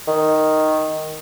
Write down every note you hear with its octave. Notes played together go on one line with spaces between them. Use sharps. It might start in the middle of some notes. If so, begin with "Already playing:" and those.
D#3